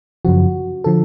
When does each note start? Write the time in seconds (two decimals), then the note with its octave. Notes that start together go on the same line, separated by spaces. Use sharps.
0.25 F#2 C#3 F3 F#4
0.84 D3 F3 A4